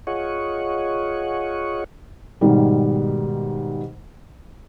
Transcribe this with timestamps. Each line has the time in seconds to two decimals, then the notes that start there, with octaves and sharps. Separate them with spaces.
0.07 F4 G#4 C#5 D#5 F#5 C#6
2.41 G#2 B2 D#3 G3